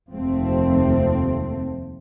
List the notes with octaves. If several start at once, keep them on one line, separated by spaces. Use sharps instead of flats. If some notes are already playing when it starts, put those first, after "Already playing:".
F1 D#2 F3 A3 C4